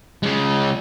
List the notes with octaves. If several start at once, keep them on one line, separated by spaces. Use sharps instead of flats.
C#3 G#3